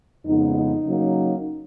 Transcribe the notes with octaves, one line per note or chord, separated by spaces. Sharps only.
F2 C#3 G#3 B3 D#4
D#4
C#3 F#3 A#3 C#4